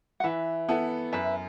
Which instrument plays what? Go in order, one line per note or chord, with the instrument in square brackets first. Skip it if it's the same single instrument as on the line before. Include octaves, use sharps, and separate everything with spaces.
[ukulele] F#5
[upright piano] E3 [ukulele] B4 E5
[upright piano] B3 E4 A4
[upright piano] F#2 [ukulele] B4 E5